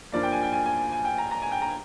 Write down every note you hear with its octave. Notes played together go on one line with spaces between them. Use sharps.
G2 F3 A#3 D5
G5
G#5
G5
G#5
G#5
G#5
G5
A#5
A#5
G#5
G5
A#5